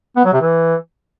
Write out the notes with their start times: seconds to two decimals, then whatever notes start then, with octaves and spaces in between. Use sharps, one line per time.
0.17 B3
0.25 F#3
0.33 C3
0.41 E3